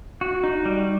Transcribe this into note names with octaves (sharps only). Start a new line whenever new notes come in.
F#4
D#4
G3